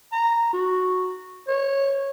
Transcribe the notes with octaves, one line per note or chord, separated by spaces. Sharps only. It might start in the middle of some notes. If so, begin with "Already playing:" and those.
A#5
F#4
C#5